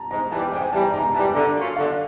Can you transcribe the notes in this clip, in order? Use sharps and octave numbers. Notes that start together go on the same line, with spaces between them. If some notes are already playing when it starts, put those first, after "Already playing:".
Already playing: A5 A#5
G#2 A#5
E3 G3 A5
G#2 G5
G#5
E3 G3 A5
A#5
G#2 A#5
A#5
E3 G3 A5
A5
D3 A#5
F#3 A#3 C#4 F4
D3 F5